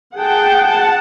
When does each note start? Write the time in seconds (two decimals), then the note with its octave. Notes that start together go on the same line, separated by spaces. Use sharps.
0.16 G#4 F#5 G5 A5
0.67 F#5 A5